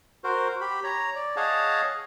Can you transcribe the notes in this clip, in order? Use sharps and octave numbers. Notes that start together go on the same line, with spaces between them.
F#4 A#4 C5
G4 B5
C#5 A#5
D5
G#4 C#5 D#5 F5 F#5 A5